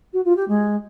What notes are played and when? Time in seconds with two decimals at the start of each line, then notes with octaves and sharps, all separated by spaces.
0.13 F#4
0.25 F4
0.36 G4
0.48 G#3